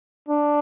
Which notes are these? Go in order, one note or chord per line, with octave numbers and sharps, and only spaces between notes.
D4